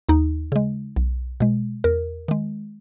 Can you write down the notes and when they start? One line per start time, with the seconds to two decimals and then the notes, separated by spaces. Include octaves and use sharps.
0.09 D#2 D#4
0.52 C#3 G#3
0.96 B1
1.40 B2 G#3
1.84 E2 A#4
2.28 D#3 G#3